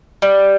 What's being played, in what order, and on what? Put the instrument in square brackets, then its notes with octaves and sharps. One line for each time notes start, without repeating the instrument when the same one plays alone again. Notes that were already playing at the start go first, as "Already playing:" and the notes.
[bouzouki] G3